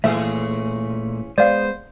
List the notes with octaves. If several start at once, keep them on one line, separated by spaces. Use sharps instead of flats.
A#2 E3 A3 C#4 G#4 E5
G#3 A#3 B3 C5 D5 F5